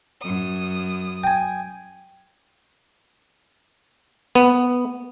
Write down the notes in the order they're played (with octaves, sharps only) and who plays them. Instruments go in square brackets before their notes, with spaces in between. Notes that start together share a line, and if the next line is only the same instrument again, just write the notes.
[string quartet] F#2 D#6
[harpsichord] G5 G#5
[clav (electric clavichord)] B3